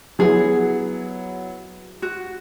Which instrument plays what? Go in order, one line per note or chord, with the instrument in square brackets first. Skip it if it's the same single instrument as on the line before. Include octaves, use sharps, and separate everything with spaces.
[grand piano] F#3 B3 E4 [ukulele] G#4
[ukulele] F#4